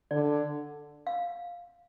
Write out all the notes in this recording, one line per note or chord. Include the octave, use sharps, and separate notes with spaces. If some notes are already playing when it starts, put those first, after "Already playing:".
D3 D5
F5